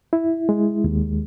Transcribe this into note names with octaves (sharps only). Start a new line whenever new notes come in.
E4
G#3
D#2